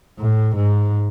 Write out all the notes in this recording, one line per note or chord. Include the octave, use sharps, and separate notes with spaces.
A2
G#2